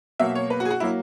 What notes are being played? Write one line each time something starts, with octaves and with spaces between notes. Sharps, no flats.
B2 F#3 A#3 E5
C#5
B4
F#4
G#4
F#4
F#3 A#3 E4